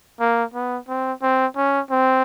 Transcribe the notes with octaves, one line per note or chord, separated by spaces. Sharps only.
A#3
B3
C4
C4
C#4
C4